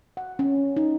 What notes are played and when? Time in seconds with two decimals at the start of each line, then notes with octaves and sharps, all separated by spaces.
0.17 F#5
0.39 C#4
0.77 D#4